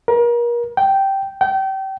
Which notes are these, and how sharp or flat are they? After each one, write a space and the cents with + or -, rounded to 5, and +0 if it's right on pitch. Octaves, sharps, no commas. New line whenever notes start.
A#4 +35
G5 -10
G5 -30